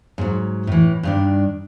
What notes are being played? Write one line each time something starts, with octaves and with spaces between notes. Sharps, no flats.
G#2 F#3
A2 E3
G2 D#3 D4